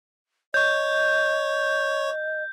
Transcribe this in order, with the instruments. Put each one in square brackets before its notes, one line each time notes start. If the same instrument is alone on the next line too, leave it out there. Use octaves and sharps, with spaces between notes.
[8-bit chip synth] C#5 C#6 [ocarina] D#5 [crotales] G6